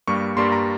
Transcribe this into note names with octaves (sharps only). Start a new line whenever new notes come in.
G2 G3 A#3 C#6
G2 G3 A#3 C6
A#5